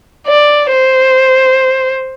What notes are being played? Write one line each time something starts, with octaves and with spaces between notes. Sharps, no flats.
D5
C5